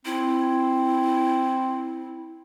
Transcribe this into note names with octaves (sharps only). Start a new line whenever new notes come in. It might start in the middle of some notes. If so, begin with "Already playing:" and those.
C4 E4